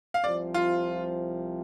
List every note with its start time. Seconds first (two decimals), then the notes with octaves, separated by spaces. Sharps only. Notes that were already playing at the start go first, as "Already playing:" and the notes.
0.14 F5
0.23 C2 C3 F3 D5
0.54 F4